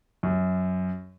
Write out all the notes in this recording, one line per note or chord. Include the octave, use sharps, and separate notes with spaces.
F#2